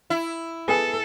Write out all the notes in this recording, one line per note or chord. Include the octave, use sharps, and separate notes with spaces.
E4
B3 G#4 A4